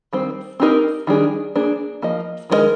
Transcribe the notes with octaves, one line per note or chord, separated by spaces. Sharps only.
D#3 G3 C4
C4 D#4 G4 A#4 D#5
D#3 G3 D4 G#4
A#3 D4 G#4
F3 A#3 D#5
D#3 G#3 D#4 A#4 D#5